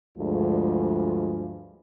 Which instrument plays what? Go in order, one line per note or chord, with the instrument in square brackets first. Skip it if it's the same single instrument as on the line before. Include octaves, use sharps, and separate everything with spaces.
[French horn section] D2 G2 F3 G#3